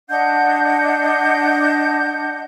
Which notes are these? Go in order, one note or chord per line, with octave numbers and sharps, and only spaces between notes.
D4 D#5 F#5 G6